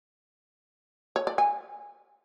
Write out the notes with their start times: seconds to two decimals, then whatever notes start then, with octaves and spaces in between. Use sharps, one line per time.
1.16 C#5
1.27 D5
1.38 G#5